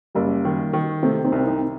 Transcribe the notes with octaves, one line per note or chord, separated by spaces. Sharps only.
F#1 G3 A#3
D#3
D#3
C3 A3 C4
C4 D#4
C2
C4 D#4